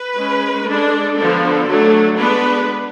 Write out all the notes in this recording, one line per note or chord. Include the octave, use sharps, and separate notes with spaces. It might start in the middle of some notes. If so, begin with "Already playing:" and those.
Already playing: B4
G#3 C#4
G#3 D4 A4
D3 F3 B3 D4
F#3 A3 D4
G#3 B3 D4 B4